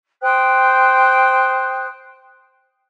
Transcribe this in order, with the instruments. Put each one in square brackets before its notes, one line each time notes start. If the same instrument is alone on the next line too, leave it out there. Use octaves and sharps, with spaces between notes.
[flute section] C5 G5 D#6 F#6